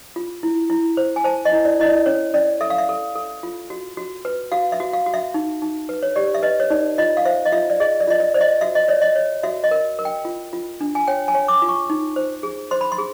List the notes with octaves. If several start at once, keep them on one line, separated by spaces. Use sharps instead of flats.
F4
E4
E4
C5
G#5
C5 A5
D#5
E4
D5
E4 D#5
D5
C#4 C#5
C#4 D5
A4 E5
F5
E5
A4
A4
F4
F#4
F#4
B4
F#4 F5
E5
F#4
F5
F#4
E5
D#4
D#4
B4
C#5
G4 D5
E5
B4 D#5
C#5
D#4 D5
F4 D#5
F5
C5 E5
D#5
F4 E5
D5
G#4 D#5
D5
F4 D#5
D5
C5 D5
D#5
F#4 E5
D#5
C#5 D5
D#5
C#5
F#4 E5
D#5
A#4
A#4
G5
F4
F4
D4
G#5
C#5 G5
G#5
C#5
D6
F4
C#6
D#4
C5
G#4
C5 C6
B5
C6
G#4